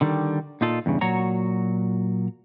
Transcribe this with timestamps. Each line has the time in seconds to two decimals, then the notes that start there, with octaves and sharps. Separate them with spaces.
0.01 D3 D#3 G3
0.61 A#2 D#4 F4 A4
0.86 E2 G2 C#3
1.01 A#2 F#3 F#4 C#5 A#5